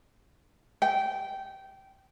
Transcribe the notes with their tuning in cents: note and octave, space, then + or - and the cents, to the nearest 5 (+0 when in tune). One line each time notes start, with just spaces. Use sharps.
G5 -20